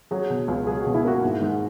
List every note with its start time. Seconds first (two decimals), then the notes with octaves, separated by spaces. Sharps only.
0.11 F#3 G#4
0.30 B2
0.48 C#2
0.67 F#3 G#4
0.81 F#4
0.86 B2
0.94 E4
1.05 A#3 F#4
1.23 G#2
1.42 G#2